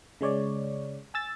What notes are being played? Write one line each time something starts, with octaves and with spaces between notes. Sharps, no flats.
C#3 G#3 C#5 D5
G#5 E6 A6